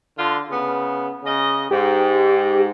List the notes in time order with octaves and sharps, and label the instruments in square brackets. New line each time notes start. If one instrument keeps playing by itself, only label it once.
[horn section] D3 F4
C#3 B3
C#3 D#5
[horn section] G#2 [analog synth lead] G4